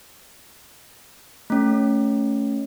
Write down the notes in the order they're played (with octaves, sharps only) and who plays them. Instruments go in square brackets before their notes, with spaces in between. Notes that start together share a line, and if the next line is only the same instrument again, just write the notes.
[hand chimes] A3 C#4